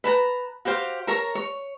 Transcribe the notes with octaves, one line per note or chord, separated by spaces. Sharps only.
B4 A5 A#5
F#4 G4 C5 F5
A#4 C#5 A5 A#5
C#5